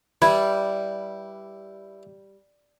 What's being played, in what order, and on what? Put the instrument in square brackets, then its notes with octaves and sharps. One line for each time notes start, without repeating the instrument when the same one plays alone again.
[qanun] G3 [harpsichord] E4 B4 [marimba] B5 G#6